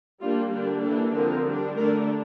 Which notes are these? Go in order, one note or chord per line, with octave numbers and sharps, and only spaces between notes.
G3 A#3 D4 F4
D3 G3 A#3 D4 G4
E3 A#3 D4 A4
D3 F3 C4 A#4
G3 D4
D3 A3 D4 A#4